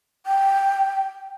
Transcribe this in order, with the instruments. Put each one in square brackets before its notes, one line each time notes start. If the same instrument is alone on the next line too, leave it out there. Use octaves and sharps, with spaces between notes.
[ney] G5